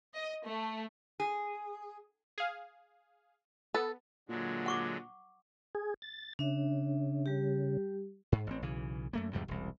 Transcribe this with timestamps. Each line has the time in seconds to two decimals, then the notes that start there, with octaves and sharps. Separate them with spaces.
0.16 D#5
0.46 A3
1.20 G#4
2.38 G#4 F5
3.74 B3 A4
4.29 A#2 D3 F#3 G#3
4.66 F#5 C#6 D6
5.75 G#4
6.02 A6
6.39 C#3 D4 E5
7.26 G3 G4
8.32 G#2
8.47 A1 C4
8.62 B1 C#3 E3
9.13 F#2 A3 A#3
9.33 E2 G#2 C3 G3
9.48 E1 C2